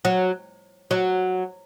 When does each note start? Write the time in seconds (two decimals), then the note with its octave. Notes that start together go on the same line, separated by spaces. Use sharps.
0.05 F#3
0.91 F#3